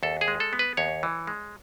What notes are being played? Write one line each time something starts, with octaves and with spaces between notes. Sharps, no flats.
D#2 A4
G#4
G#3
A4
B3
B4
D#2 C#5
E3
G#3